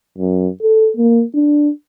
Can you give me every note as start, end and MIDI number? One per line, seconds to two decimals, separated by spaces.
0.18 0.49 42
0.62 0.91 69
0.97 1.23 58
1.35 1.70 62